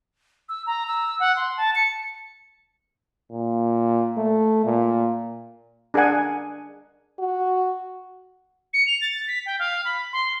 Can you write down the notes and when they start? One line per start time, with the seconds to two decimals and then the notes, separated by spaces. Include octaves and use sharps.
0.49 E6
0.67 A#5
0.87 E6
1.20 F#5
1.36 C6
1.57 A5
1.75 C#7
3.32 A#2
4.18 A3
4.65 A#2
5.94 D4 G#4 A#4 F#5 G#5
7.19 F#4
8.74 C#7
8.87 F7
9.02 A6
9.28 B6
9.46 G5
9.59 F5
9.85 B5
10.13 C6